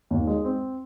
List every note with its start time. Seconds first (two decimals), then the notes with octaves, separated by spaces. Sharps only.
0.11 D#2
0.27 G#3
0.45 C4